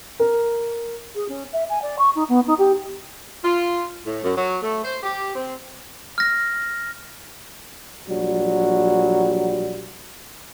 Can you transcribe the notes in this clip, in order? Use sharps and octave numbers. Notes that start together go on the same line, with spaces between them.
A#4
G#4
C#4
E5
G#5
D5
C#6
D#4
B3
D#4
G4
F4
A2
F#2
F#3
A3
C5
G4
C4
F6 A#6
A#1 F#3 G3